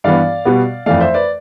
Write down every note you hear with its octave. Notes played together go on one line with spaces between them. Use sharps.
G2 E3 G3 B3 D5 F5
B2 G3 B3
F2 E3 A3 D5 F5
C5 E5
B4 D5